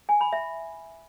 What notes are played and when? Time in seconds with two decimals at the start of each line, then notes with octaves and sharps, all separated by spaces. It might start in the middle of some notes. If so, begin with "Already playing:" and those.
0.09 G#5
0.21 B5
0.33 E5